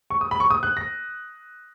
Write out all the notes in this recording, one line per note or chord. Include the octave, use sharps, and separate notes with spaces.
C#6
D#6
B5
C#6
D#6
F#6
A#6